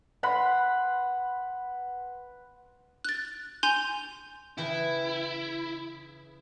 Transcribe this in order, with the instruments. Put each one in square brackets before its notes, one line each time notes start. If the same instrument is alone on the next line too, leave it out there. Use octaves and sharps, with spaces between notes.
[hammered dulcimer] B4 F#5 B5 C6
[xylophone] F#6 A6
G#5 C6 G6 D#7 F7 G7
[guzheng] C#3 E3 G5 [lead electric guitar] E4